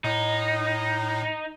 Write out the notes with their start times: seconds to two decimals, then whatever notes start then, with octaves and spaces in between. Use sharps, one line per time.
0.04 A2 D#4